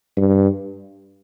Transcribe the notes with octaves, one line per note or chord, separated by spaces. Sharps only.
G2